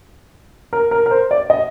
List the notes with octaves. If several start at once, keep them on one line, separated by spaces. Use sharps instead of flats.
A#4
A#4
A#4
C5
D5
D#5